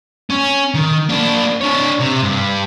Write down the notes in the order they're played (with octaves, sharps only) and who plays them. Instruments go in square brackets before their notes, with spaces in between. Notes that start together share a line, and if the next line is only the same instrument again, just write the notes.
[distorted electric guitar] C#4
D#3
A#3 D4
D4 C#5
C3
G2